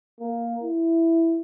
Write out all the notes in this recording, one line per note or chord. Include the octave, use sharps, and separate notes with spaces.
A#3
E4